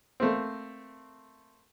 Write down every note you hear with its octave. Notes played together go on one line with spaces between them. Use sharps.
A3 A#3 C4